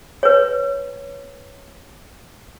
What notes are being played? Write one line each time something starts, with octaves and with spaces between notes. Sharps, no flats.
B4 C#5